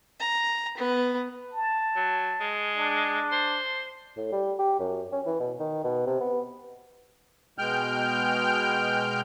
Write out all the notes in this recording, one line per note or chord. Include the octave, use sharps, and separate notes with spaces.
A#5
B3
A5
F#3
G#3
D4
C5
A2
G3
G4
F#2
C#4
E3
B2
D#3
B2
C3
B3
B2 G#3 G5 F6 G6